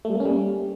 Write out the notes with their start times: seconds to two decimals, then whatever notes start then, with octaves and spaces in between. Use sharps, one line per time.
0.05 A3
0.10 G3
0.15 A#3
0.20 C#4
0.25 G3